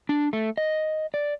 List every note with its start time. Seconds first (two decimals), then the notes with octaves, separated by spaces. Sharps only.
0.09 D4
0.33 A3
0.58 D#5
1.14 D5